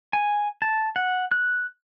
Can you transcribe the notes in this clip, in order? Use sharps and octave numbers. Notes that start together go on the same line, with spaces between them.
G#5
A5
F#5
F#6